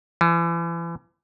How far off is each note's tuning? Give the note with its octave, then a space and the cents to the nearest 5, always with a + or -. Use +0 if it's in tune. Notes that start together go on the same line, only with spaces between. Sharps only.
E3 +35